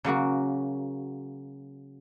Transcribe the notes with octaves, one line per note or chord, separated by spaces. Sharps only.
C#3 F#3 A#3 F#4